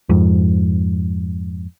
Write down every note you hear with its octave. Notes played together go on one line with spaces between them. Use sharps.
F2 G#2